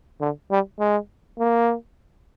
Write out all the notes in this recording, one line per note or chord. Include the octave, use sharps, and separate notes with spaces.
D3
G3
G#3
A#3